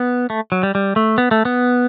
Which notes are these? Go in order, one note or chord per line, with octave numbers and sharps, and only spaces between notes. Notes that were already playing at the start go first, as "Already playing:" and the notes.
Already playing: B3
A3
F#3
G3
G3
A3
B3
A3
B3